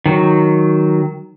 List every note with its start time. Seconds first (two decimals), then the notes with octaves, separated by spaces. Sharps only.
0.06 D#3 F#3